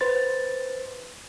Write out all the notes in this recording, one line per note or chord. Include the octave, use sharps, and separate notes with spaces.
B4 C5 A6